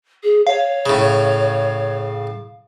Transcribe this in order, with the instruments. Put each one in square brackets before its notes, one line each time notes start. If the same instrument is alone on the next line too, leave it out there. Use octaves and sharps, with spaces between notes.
[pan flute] G#4
[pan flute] C#5 [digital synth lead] F5
[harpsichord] A2 C#3